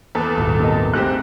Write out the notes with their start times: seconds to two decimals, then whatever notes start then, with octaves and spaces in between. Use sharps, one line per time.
0.15 E2 B3 A4 B4 D6
0.38 D#1 G#1
0.59 C3 A#4 D#5
0.94 A1 G#2 C4 G4 F#6